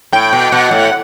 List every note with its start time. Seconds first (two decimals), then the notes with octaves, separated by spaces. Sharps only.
0.13 A2 G5
0.33 B2
0.52 B2 F#5
0.71 A2